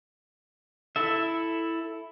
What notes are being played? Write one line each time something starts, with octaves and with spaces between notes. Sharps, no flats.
E4 A4 E5